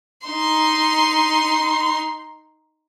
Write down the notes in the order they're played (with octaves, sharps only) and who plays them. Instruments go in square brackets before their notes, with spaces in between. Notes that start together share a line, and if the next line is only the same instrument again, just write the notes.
[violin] D#4 C6